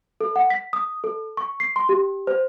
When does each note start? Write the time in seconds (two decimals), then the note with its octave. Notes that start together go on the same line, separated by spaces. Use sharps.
0.21 A4
0.36 F#5
0.50 B6
0.73 D#6
1.04 A4
1.37 C#6
1.60 C7
1.76 C6
1.89 G4
2.27 C5